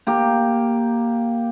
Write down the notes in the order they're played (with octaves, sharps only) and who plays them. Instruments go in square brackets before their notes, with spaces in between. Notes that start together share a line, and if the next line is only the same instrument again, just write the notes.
[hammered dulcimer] A#3 G4